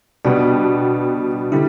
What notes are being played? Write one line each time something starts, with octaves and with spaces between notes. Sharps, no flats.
B2 G3 B3 D4
D3 G3 E4